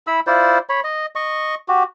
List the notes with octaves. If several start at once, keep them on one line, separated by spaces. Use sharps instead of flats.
E4 B5 E6
E4 F4 C5 D5
C#5 B5
D#5
D#5 C#6
F#4 G4